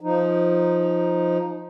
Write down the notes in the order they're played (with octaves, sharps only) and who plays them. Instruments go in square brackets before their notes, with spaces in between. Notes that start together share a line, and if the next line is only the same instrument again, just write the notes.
[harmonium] F3 D#4